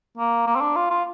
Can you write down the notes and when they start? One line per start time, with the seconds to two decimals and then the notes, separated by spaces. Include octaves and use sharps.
0.17 A#3
0.47 A#3
0.56 C4
0.61 D4
0.76 F4
0.90 F4